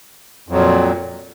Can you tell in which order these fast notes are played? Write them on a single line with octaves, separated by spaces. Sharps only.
F2 F#3 A#2